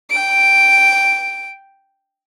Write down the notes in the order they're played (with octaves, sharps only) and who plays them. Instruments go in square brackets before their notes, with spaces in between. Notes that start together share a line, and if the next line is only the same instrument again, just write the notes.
[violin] G5 D7